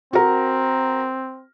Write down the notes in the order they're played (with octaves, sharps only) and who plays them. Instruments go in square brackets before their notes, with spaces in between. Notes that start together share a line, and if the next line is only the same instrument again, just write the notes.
[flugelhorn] C4 [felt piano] F#4 A#4